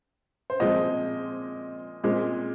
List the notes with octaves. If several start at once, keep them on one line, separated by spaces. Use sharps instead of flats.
C5
A#2 F3 G#3 C4 D#5
A#2 G#3 C4